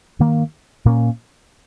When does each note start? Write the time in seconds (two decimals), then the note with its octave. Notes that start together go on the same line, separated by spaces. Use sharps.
0.19 G2 D#3 A#3
0.85 A#2 A#3 C#4